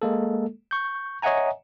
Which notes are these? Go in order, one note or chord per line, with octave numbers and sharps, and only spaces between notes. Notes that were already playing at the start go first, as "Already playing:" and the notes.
G#3 A#3 A4
C#6 G6
C#5 D#5 E5 F#5 G#5 A#5